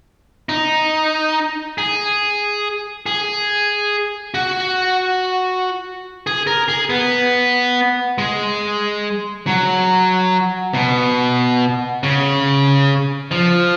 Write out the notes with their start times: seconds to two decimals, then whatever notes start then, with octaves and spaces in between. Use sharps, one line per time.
0.49 D#4
1.78 G#4
3.06 G#4
4.34 F#4
6.27 G#4
6.47 A#4
6.68 G#4
6.90 B3
8.18 G#3
9.47 F#3
10.74 B2
12.03 C#3
13.31 F3